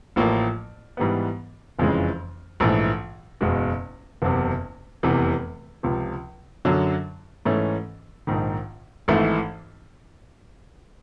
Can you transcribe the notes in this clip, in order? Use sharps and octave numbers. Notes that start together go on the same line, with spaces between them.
A1 A2 F3 A#3
G#2 E3 G3 B3
F#1 F2 C#3 E3 G#3
A#1 G#2 E3 A3
F#1 E2 B2 G#3
F#1 E2 C3
F1 E2 C3 E3
C#2 C3 F3
F#2 D3 F#3
G#2 E3 A3 C#4
A#1 G#2 D#3
G#1 G#2 E3 A3